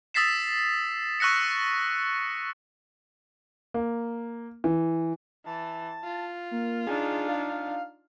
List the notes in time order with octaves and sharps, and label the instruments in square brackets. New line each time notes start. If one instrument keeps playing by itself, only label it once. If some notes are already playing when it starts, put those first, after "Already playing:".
[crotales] D#6 E6 A6 B6 C7 E7
C#6 E6 F#6 A#6 C#7
[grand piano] A#3
E3
[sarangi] E3 [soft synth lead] A5
[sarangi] F4
[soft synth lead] A#3
[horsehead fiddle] D4 D#4 [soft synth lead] G#4
[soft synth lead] F5